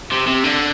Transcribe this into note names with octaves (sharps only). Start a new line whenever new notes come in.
C3
C3
D3